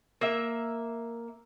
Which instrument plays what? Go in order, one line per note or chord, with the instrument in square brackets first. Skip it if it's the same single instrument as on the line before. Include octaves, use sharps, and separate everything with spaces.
[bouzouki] A#3 E5